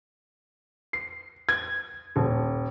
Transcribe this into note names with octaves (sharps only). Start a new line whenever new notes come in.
C7
G#6
D#1